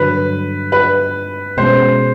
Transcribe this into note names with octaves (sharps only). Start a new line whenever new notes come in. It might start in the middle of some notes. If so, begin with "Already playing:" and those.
Already playing: G2 D3 F#3 B4
B4
B2 G#3 C#4 C5